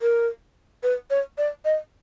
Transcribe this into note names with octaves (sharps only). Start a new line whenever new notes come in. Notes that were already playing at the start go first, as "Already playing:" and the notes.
A#4
B4
C#5
D5
D#5